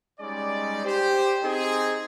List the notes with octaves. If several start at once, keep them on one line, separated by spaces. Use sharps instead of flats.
G3 G#3 C#4 D#4 D5
G4 C5
C4 D#4 G#4